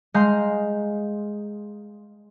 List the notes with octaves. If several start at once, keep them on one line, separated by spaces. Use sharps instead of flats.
G#3 F5 A#5 C6 G6